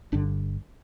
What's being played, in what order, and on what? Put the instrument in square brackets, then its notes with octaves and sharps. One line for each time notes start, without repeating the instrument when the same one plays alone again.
[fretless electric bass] G1 G2 D3 D4